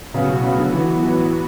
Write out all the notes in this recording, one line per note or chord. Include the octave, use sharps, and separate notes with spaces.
A2 C#3 F#3 B3 F#4
B2
C#3
D3
E3
E3